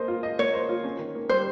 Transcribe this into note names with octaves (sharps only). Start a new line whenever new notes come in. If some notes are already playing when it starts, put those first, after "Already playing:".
Already playing: A#3 C5 D#5
F4
D#5
A#3 C#5
C5
F4
C#4
D#3
A#3
G3 C5